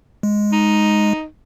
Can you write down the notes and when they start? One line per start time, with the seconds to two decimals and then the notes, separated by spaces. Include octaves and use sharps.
0.23 G#3
0.52 D#4